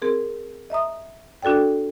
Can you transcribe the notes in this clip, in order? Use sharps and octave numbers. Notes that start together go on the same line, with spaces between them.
C4 G#4 A#4
D#5 E5 A#5 D#6
D4 F#4 A4 D5 G5